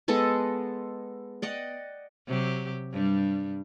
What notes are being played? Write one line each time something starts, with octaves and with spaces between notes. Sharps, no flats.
G#3 B3 A4 D#5
D5 D#5 F#5 G5
C3 F#3 G4
G2 G3